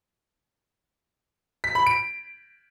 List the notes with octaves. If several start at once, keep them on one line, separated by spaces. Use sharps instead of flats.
B6
B5
D7